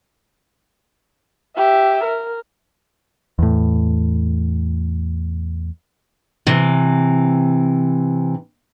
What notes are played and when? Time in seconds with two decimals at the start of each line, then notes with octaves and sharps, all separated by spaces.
1.57 G4 E5
2.04 A#4
3.39 E2 A2
6.47 C3 E3